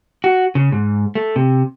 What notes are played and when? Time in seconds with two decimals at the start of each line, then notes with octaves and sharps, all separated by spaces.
0.24 F#4
0.55 C#3
0.72 G#2
1.15 A3
1.36 C3